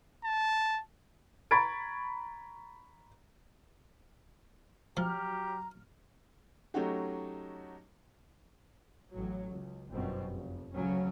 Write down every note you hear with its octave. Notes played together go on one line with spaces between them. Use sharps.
A5
A#5 B5 C#6 G#6 A6 D7
F3 F#3 G4 A#5 F6
F#3 A3 C#4 D#4 F#4 G4
A1 F#3
C#2
G1 F#2 B2 C4
F1
D2 C#3 F#3 C#4